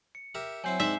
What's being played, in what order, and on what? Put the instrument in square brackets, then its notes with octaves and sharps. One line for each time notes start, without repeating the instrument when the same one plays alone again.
[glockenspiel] C#7
[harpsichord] G4 A#4 E5
[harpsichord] F#3 C4 E4 [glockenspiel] G#5 G6 C7
[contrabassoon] G#2 [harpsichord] C4 D4 E4 [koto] E5